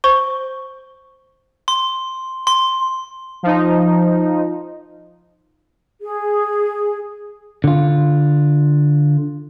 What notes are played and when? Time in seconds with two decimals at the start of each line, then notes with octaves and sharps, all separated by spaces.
0.04 C5 C#6 G7
1.68 C6
2.47 C6
3.43 F3 D#4
6.02 G#4
7.64 D3 F4